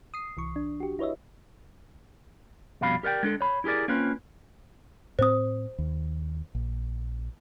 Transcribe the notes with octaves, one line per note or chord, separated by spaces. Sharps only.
D#6 C7
C2 E3 C#6
D4
F#4 G4
E4 B4 C#5 D#5 E5
F2 B2 G3 F5 B5
G4 A#4 D5 F#5 G5
G#3 D4 A4
C#5 B5
E4 G4 G#4 A#4 D5
A#3 C4 C#4 F4 B4
A2 C4 C5 D#6
D#2
A#1